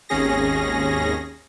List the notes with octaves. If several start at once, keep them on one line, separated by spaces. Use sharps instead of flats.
G#1 D#2 C#4 G#4 A#6